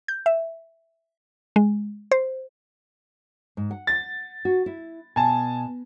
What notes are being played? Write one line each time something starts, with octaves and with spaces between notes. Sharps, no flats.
G6
E5
G#3
C5
G#2
F#5
A6
F#4
E4
B2 G#5 A5